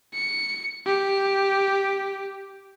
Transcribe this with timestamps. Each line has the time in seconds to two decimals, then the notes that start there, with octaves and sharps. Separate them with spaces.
0.14 C#7
0.86 G4